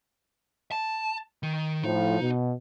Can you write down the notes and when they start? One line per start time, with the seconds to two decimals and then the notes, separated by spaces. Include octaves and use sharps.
0.72 A5
1.43 D#3
1.84 A2 F3 D#4
2.20 B2